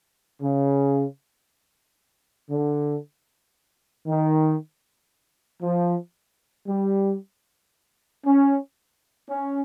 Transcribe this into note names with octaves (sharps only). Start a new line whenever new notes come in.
C#3
D3
D#3
F3
G3
C#4
C#4